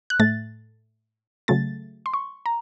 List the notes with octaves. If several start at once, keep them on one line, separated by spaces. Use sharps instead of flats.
F#6
A2 A3 A6
C#3 F#3 A3 A6
C6
C#6
A#5